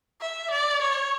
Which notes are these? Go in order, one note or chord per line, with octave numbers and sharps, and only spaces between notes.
E5
D5
C#5